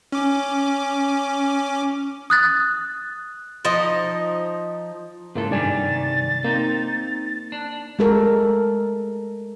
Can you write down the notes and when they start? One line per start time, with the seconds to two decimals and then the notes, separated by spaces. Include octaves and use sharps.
0.12 C#4 D6
2.30 D#6 F#6 A6
3.65 F3 D#4 D#5
5.35 G#2 C#3 A#3 E4 A4
5.51 G2 C3 D#3 G3 D5 G#5 A6
6.44 A#3 C4 D#4
7.52 D4
7.99 G#3 A4 A#4